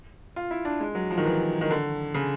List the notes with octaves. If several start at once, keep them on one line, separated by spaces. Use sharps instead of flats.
F4
E4
D4
G#3
F#3
F3
D#3
E3
D#3
D3
C#3